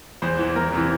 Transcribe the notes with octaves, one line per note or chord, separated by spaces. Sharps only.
E2 C5
E3
E2 A#4
C3 E3